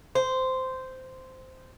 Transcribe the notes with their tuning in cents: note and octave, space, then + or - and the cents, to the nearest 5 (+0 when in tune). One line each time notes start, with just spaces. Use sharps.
C5 -10